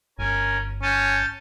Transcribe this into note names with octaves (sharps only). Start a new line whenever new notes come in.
G1 C#4 A#4 G#5
C#4 A5 G6 A6